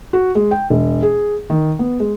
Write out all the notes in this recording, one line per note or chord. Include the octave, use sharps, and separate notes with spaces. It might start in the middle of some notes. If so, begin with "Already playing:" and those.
F#4
G#3
G5
E1
G#4
D#3
B3
G#3